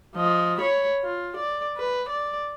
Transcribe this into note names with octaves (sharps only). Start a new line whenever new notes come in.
F3 D#5
C#5 B5
F4
D5
B4
D5